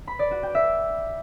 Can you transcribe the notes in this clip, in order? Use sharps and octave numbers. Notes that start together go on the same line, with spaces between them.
B5
D5
F#4
G5
E5